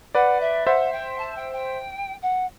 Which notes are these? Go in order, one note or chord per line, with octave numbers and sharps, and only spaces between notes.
B4 D5 F#5
E5
C5 E5 F#5
G5
A5
G5
G5
F#5